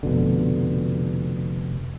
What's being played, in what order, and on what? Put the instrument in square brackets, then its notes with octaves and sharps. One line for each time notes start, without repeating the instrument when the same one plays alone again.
[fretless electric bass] F1 B2 D3